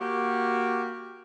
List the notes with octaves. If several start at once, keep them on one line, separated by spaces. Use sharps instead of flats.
A#3 F#4 G4